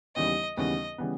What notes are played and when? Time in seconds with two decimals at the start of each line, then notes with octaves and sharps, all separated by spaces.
0.16 D#2 C#3 E3 G3 B3 D#5
0.57 D#2 C#3 E3 G3 B3 D#5
0.98 C#3 E3 G3 B3